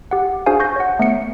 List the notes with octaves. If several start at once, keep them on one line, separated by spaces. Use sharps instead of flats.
G4 F#5
D4 F#4 G#4 C5 F5 G#5
C#6 G6 A#6
C#5 F#5
A3 B3 C#7